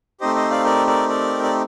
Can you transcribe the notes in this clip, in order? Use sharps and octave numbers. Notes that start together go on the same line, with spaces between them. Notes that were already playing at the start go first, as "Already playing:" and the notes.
A3 C4 D#4 G4 C5 D#5
C5 D#5
D5 F5
A#4 D5
A#4 D5
A#4 D5
D5